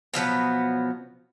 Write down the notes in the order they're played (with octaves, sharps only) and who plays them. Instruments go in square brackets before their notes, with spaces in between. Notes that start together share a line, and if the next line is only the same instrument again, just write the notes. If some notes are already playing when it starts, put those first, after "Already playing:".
[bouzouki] B2 F3 F#3 B3